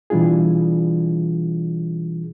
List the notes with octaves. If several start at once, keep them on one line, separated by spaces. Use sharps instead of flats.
B2 E3 G3 D4 F4 G#4